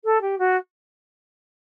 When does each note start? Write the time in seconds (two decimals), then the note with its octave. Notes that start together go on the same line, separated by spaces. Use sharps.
0.04 A4
0.21 G4
0.38 F#4